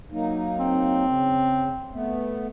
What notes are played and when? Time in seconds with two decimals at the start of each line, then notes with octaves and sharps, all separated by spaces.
0.11 F#3 A#3 D#4
0.59 C4
1.05 C#3
1.93 A3 B3